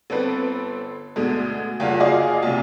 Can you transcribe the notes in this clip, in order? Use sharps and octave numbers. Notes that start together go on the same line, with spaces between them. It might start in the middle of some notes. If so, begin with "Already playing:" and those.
G1 C4 A4 B4
D2 B2 D3 G#3
F#1 G2 F4 F#5
F4 F#4 G#4 D5 D#5 F5
A#1 C3